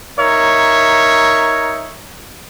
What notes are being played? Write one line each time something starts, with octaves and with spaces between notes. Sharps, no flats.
D#4 A#4 C#5 E5